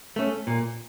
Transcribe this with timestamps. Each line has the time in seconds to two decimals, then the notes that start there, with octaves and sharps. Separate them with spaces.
0.16 A3 C#4
0.47 A#2